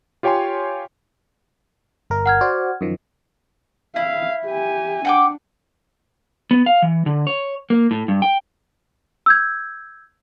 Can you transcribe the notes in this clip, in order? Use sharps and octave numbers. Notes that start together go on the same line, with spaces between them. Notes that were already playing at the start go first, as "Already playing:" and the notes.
F4 G4 C#5 G5 G#5 C6
G1 A#4
F#5 F6 G#6
F#4 C5 D5
F#2 D#3 F3
E4 F5
G4 G#5
D4 F#5 G5 D6
B3
F5
E3
D3
C#5
A#3
A2
G2
G5
E6 G6 G#6